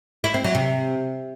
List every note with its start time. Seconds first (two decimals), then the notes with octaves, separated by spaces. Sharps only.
0.24 E4
0.34 C4
0.44 F#3
0.55 C3